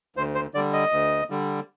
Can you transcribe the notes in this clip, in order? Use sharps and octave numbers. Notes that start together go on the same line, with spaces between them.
D2 C5
C5
D3 G3 D5
D#5
D2
D3 G3